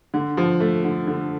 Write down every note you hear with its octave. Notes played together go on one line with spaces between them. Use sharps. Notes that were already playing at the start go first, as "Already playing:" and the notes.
D3
F3
A3
D3
D3